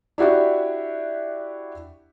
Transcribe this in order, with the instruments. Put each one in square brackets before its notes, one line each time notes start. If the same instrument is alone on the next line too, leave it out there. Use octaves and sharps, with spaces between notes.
[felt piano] D4 E4 F#4 G4 E5